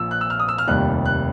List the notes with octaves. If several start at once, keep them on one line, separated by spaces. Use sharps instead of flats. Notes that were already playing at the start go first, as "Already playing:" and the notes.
Already playing: A#1 A#2 F3 E6
F#6
E6
F6
D#6
E6
F6
F1 D#2 D#3 G3 F#6
F#6